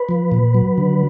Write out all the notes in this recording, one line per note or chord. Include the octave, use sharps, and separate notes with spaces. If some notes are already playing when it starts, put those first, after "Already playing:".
Already playing: B4
F3
A#2
F#3
D3